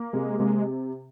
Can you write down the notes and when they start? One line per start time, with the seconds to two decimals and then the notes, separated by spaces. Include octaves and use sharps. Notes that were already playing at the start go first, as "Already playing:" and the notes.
Already playing: A#3
0.13 C3 G#3
0.39 C3 G#3